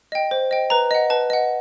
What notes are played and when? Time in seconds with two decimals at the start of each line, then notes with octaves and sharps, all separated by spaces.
0.12 D#5 G5
0.31 C5
0.51 D#5 G5
0.70 B4 A#5
0.91 D#5 F#5
1.10 B4 A5
1.30 D#5 F#5